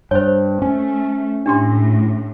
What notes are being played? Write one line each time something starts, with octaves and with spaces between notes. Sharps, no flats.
G2 C5 C#5
A3 C#4
A2 D4 G4 C6